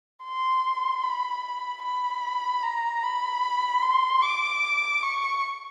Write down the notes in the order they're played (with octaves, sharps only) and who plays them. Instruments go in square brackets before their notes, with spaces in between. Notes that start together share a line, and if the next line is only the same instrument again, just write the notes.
[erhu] C6
B5
B5
A#5
B5
C6
D6
C#6